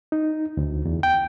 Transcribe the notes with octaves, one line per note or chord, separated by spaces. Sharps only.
D#4
D2
E2
G5